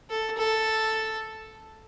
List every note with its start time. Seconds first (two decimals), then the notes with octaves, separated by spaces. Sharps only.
0.10 A4
0.38 A4